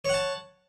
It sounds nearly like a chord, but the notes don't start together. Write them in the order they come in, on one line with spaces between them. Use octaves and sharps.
C#5 F#5 A5